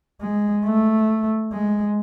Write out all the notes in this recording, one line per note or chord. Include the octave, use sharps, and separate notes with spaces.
G#3
A3
G#3